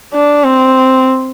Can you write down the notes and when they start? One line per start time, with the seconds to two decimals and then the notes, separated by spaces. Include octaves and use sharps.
0.14 D4
0.44 C4